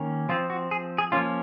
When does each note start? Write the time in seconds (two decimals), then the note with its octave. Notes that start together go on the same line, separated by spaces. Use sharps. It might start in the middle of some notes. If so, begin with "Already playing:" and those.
Already playing: D#3 A#3 C#4
0.29 F3 C4 F4
0.50 F#4
0.71 G#4
0.98 G#4
1.12 F3 A#3 C#4 F4